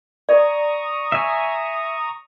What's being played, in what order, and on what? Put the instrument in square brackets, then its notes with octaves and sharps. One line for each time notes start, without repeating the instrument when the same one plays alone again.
[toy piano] D5 [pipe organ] A#5 C#6 D#6
[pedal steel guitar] E5 G#5